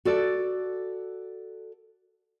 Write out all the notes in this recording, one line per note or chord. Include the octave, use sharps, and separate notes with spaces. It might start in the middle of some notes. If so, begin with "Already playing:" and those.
F#4 A4 D5